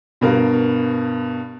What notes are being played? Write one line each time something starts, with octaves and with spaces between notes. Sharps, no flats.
G2 B2 A#4 F5